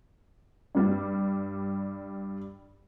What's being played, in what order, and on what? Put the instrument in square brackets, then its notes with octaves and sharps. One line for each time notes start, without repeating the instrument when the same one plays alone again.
[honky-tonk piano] G2 G3